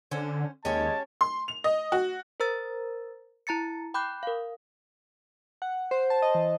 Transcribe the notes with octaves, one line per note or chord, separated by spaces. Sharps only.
D3 C#4 C5
D#2 G#3 C#4 G4 C#5 A5
C6
F7
D#5
F#4
A#4 C5 A#5 E6 A6
E4 A#5 A6 C#7
G5 B5 D6 F#6 G6
A#4 F5
F#5
C5
A5
D#5
E3